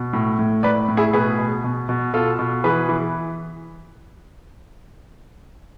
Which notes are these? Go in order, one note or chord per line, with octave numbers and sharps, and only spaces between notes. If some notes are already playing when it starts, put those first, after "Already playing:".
Already playing: B2
A2
A2
A2 B4 D5
A2
E4 G#4
B2 G#4 B4
B2
B2
B2
B2 F4 A4
B2
E3 G#4 B4
E3